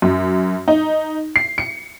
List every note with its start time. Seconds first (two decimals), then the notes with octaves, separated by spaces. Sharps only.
0.02 F#2
0.68 D#4
1.36 C7
1.58 C#7